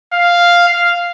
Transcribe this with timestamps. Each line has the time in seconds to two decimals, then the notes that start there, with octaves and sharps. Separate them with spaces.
0.13 F5
0.69 F5